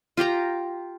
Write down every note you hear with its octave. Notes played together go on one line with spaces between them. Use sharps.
F4 G4 G5 A#5